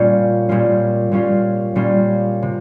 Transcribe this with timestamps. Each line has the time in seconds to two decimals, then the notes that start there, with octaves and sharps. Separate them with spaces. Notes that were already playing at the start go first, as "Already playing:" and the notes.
Already playing: A#2 G3 C#4 F4
0.49 A#2 G3 C#4 F4
1.12 A#2 G3 C#4 F4
1.75 A#2 G3 C#4 F4
2.42 C3